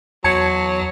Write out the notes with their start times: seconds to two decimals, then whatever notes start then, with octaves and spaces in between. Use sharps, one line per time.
0.24 E2 F#3 A5 G#6 C#7